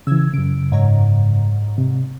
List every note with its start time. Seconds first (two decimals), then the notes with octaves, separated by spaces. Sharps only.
0.07 C#3 E3 E6 G#6
0.34 F#2 C#3 D7
0.72 G#2 C#5 A#5
1.78 C3